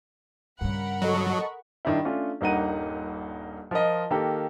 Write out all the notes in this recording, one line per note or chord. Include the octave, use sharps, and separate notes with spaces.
G2 C#3 A#4 F#5 B5
F#3 A4 D#5 C#6
G2 D#3 D4 E4
A3 C#4 D4 F4
D#1 G2 A#3 D#4 F#5 D#7
F3 F4 A#4 D#5
D#3 A#3 G4 A4